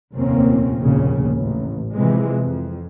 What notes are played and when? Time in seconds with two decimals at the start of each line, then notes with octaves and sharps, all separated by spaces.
0.15 F1 D#2 A#2 A#3 C4 C#4
0.80 F1 A#1 D#2 C#3
1.38 A1
1.96 C3 E3 F3 G#3
2.42 F2